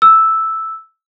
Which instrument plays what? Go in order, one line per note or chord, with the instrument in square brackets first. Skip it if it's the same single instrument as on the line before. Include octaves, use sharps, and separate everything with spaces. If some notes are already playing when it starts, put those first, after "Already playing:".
[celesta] E6